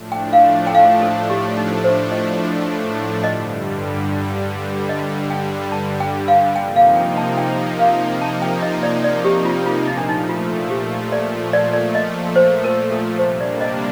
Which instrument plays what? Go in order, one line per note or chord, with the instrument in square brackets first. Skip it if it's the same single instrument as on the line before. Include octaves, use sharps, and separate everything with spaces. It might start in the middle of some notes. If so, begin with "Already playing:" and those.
Already playing: [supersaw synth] A2 F3 A3 D4
[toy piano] G5
F5
G5
F5
A4
G4
D#4
C5
D#5
[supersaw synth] G2 D3 G3 [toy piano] D#5
[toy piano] D#5
G5
A5
G5
F5
[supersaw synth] C3 F3 A#3 D#4 [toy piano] G5
[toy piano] F5
G5
A5
G5
F5
A5
G5
D#5
D5
D5
G4
F4
F4
[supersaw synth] A#2 F3 A3 [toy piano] D#4
[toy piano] D4
D#4
F4
G4
D5
D5
D5
D#5
C5
A#4
A4
[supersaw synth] C3 G3 A#3 D4 [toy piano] C5
[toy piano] D5
D#5